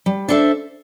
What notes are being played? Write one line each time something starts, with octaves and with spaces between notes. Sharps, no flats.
G3
D4 A4 C5 E5